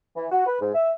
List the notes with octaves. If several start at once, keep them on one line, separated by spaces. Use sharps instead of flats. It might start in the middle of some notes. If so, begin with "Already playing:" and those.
E3
F#4
B4
G#2
E5